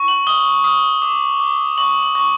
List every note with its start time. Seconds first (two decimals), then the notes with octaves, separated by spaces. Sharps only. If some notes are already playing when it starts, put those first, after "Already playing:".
Already playing: C#6
0.08 F#7
0.27 D#6 G7
0.64 D#6
1.02 D6
1.40 D6
1.78 C#6 F#7
2.03 F#7
2.15 C#6